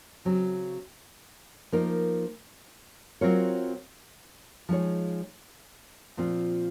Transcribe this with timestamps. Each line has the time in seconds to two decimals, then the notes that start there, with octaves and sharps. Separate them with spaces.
0.25 C#3 F#3 C4
1.72 F3 A#3 D#4 A#4
3.21 F#3 C4 F4 A#4 C#5
4.69 F3 G#3 D#4 G#4 C#5
6.17 A#2 F3 C4 F4